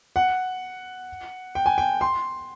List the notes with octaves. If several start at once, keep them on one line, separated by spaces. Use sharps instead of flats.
F#5
G5
G#5
G5
C6